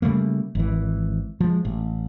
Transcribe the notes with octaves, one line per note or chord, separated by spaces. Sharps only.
C#3 G3 A3 A#3
G#1 E3
F3 G#3
A1